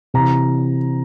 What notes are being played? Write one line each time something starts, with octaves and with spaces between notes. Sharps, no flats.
C3 E3 A#5